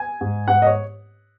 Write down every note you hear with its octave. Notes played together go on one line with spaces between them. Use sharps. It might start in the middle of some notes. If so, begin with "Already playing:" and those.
Already playing: G#5
G#2
G#2 F#5
D#5
C#5